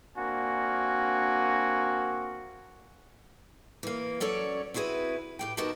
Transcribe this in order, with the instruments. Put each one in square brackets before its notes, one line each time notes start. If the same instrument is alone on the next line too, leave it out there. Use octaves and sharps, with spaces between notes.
[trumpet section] A#3 C4 D4 F#4 G#5
[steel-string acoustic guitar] E3 A#3
F#3 C#4 A4 C#5 D5
C4 E4 F#4 G#4 B4
A2 G4 G5
D#3 B3 F#4 G4 A#4 A5